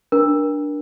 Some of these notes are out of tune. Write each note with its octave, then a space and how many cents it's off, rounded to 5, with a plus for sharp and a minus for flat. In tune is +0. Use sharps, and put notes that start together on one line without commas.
D4 +0 A#4 +30